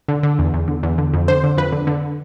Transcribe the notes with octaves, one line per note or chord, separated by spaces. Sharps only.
D3
D3
E2
E2
D3
E2
D3
F2
D3 C5
D3
F2 B4
D3
D3